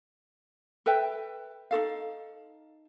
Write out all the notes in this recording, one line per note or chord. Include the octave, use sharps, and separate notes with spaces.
A4 B4 E5 G5
D#4 F#4 A4 F5